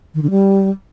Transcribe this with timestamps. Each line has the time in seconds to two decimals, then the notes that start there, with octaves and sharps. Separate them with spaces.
0.14 D#3
0.22 D3
0.30 G3